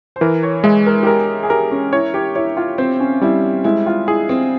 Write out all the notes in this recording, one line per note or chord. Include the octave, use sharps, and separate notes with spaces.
C5
E3 A#4
C#5
G#3 E5
A#4
G4
G#4 A#4
G#4
G#4
G4 A#4
C#4
E4 C#5
G4
E4 C#5
F4
C4 C5
C#4
G3 E4
G#3 E4
F4
E4 G#4
C4